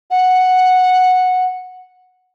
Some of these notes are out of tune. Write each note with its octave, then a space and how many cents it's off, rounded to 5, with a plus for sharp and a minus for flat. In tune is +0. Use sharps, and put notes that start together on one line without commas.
F#5 -5